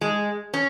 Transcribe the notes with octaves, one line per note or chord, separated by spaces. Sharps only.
G#3
C#4